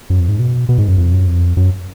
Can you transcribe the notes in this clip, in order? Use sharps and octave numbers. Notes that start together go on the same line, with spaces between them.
F#2
F2
G#2
B2
B2
G#2
F#2
F2
F#2
F2
F#2